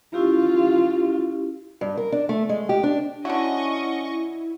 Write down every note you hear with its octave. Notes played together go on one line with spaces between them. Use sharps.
C#4 E4 F4 G4
G2
A#4
D4
A3
G#3
G4
D4
D3 C#4 E4 F#4 D#5 C#6